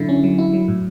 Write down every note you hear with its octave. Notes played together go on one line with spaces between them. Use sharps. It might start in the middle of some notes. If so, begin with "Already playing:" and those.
Already playing: D3 F#3 E4
C#4
F#3
E4
F#3
A2